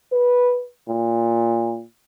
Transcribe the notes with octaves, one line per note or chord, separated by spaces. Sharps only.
B4
A#2